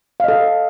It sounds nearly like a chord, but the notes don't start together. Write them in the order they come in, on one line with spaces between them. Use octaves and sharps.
F5 D#5 A4